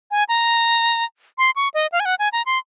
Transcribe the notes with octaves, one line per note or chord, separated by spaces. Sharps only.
G#5
A#5
C6
C#6
D#5
F5
G#5
F#5
G#5
A#5
C6